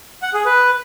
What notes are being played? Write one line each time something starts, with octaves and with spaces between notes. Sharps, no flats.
F#5
G#4
B4